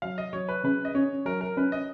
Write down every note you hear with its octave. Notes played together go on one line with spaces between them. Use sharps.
F#3 F5
D#5
F#3 C#5
B4
C#3 B4
D#5
C#4 C#5
F#3 A#4
A#4
C#4 B4
D#5